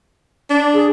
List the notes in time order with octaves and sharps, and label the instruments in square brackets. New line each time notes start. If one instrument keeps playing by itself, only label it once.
[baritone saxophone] D4
[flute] G#4